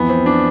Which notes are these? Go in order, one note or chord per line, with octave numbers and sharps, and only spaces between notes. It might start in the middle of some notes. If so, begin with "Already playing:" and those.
Already playing: F2 E3 B3
C4
D4